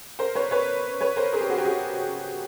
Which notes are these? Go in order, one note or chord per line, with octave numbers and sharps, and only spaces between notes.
A#4 C5
B4 C#5
B4 C#5
B4 C#5
A#4 C5
G#4 A#4
G4
F#4 G#4
G4
F#4 G#4